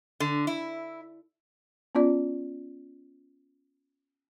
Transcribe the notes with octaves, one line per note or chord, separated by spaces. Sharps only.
D3
E4
B3 C#4 F4 D5